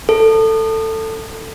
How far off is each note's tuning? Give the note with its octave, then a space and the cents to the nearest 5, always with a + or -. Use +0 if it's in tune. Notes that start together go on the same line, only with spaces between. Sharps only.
A4 +15